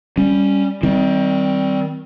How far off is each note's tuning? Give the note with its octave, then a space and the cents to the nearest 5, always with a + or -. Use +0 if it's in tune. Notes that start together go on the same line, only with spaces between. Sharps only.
G3 +10 C#4 +0
D#3 +30 G3 -10 C4 +0